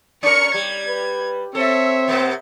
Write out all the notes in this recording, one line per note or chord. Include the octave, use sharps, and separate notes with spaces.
C#4 A#4 C#6 C#7
G3 G#6
B4
C4 A4 C#5 E5
C3 A#3 B3